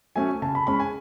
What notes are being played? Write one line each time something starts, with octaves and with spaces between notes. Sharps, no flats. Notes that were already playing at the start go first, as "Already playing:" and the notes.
F#3 A3 C#4 G#5
C#3 A5
B5
G#3 C#4 B5
G#5